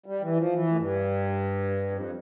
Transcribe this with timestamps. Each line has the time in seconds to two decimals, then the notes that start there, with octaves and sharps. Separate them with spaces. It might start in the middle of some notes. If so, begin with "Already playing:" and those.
0.06 G3
0.22 E3
0.37 F3
0.53 E3
0.67 A2
0.75 G2
1.91 F2